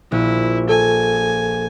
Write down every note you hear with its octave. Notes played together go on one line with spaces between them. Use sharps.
A#1 E4
A4 G#5